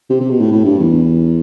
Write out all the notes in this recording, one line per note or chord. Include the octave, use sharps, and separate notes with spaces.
C3
C3
B2
A2
A2
G2
E2